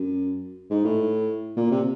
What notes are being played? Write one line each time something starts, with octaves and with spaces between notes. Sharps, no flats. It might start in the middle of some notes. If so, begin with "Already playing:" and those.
Already playing: F#2
G#2
A2
A#2
C3